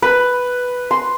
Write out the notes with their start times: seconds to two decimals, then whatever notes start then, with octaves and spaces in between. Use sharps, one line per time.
0.02 B4
0.91 C6